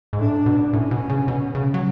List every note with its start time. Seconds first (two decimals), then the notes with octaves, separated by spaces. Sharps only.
0.13 G#2
0.19 A2 D4
0.46 B2
0.73 A2 C#4
0.91 B2
1.09 C#3
1.28 B2
1.55 C#3
1.74 F#3